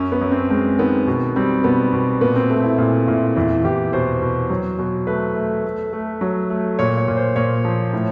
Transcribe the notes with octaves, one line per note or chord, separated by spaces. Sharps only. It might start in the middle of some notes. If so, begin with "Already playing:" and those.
Already playing: F#2 C#4
B3
F#2
C4
G#3 C4
D#3 B3
B2
G3 C4
B2 B3
B2
A#2 B3
C4
A3
E4
A#2 E4
A#2 E4
E2 E4
E2 G4
B2 C5
B2
F#3
B2
A3 B4
A3
A3
A3
F#3
A3
A#2 C#5
C#5
A#2
C5
A#2 C#5
F3
A2